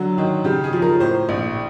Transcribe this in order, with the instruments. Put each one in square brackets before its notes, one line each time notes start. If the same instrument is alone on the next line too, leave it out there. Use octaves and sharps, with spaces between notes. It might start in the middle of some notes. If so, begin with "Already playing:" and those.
Already playing: [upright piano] D3 F#3 F#4
D#3
C#3 G4
G#4
F3
A#4
A2 C5
A#1